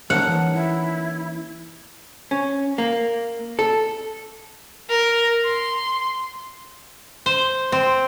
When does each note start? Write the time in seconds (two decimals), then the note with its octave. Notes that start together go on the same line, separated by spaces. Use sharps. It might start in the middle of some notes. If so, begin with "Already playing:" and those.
0.10 A#3 C#4 D#4 F#5 A5
0.27 E3
0.53 E4
2.31 C#4
2.78 A#3
3.59 A4
4.89 A#4
5.45 C6
7.26 C5
7.72 C4